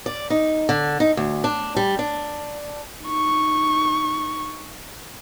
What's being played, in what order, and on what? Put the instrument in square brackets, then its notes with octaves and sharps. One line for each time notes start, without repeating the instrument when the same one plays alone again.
[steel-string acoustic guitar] D5
D#4
D3
D#4
D2
D4
G3
D4
[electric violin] D#4 C#6